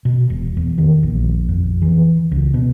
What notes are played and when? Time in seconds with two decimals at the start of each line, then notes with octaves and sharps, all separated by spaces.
0.05 B2
0.30 E1
0.57 E2
0.78 D#3
1.03 A#1
1.49 F2
1.82 E3
2.31 C#2
2.54 B2